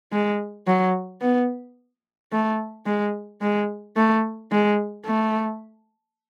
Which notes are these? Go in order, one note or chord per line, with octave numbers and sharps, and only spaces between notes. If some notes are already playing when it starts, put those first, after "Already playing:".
G#3
F#3
B3
A3
G#3
G#3
A3
G#3
A3